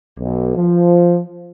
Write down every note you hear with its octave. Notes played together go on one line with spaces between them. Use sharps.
B1
F3